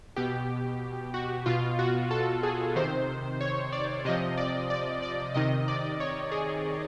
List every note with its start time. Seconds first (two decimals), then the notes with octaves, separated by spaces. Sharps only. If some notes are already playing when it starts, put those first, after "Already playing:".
0.16 B2 G4
1.14 F#4
1.46 B2 F4
1.79 F#4
2.11 A4
2.43 G#4
2.76 C3 D#3 C5
3.41 C#5
3.72 D5
4.05 C3 F3 D#5
4.38 D5
4.70 D5
5.02 D5
5.34 C3 D#3 D#5
5.68 D5
6.00 C#5
6.32 G#4